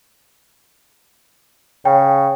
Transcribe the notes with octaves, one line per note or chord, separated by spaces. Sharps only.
C#3 G5